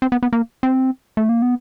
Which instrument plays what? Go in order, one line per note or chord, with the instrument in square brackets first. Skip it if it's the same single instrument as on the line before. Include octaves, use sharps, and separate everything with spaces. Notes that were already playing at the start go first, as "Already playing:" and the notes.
[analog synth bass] C4
B3
B3
A#3
C4
A3
A#3
B3